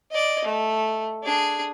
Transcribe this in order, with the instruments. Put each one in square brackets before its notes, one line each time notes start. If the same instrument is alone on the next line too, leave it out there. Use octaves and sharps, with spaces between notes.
[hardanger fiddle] D5 D#5
A3
D4 G#4